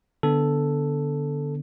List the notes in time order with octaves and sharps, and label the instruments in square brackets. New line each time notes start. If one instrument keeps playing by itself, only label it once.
[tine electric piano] D3 B3 D4 A4